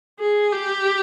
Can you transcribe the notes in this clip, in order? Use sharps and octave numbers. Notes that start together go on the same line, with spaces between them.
G#4
G4